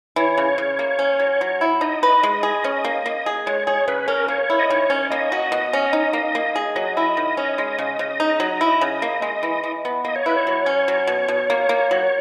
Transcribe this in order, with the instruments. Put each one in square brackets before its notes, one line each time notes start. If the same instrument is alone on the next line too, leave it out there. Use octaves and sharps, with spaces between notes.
[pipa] E3 [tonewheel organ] C#5
[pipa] C#3
C#3
A#3
C#4
F#3
F#3
E4
[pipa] D#4 [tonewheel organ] D#5
[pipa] B4
G#3
G#4
C#4
A#3
A#3
G#4
[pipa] G#3 [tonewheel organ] C#5
[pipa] G#4 [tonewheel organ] C#5
[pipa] C#3 [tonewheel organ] B4
[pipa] C#4 [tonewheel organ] A#4
[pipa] A#3 [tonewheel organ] C#5
[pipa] E4
[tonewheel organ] D#5
[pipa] D#3 [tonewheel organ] C#5
[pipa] C#4
[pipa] A#3 [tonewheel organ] D#5
[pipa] F#4
B2
C#4
D#4
A#3
A#3
G#4
[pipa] F#3 [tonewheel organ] D#5
[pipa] E4
D#3
C#4
G#3
C#3
C#3
D#4
F#3
E4
C#3
A#3
G#3
E3
E3
B3
[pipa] A#3 [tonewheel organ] D#5
[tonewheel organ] C#5
[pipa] E4 [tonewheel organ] B4
[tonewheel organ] C#5
[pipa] F#3
C#4
F#3
B2
B2
A#3
A#3
F#3